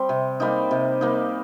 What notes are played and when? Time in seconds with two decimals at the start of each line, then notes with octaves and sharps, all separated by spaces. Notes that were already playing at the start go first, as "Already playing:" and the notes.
Already playing: G3 C4
0.09 C3
0.40 G3 A#3 D#4
0.71 C3
1.01 G3 A#3 D#4